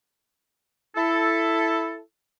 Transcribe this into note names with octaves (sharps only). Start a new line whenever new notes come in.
E4 A4